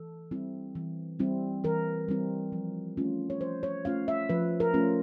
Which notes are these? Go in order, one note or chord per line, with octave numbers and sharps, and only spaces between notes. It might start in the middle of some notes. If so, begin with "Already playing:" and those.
Already playing: E3 A4
G3 C4 E4
E3
G3 C4 E4
E3 A#4
G3 C4 E4
F3
A3 C#4 F4
C#5
F3 C5
C#5
A3 C#4 F4 F5
E5
F3 B4
A#4
A3 C#4 F4